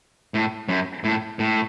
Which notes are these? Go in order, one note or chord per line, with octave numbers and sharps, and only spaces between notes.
A2
F#2
A2
A2